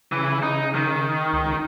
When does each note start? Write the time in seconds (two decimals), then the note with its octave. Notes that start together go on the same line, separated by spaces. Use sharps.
0.12 C#3 E3 B4
0.42 D#4
0.75 D#3
1.33 C#2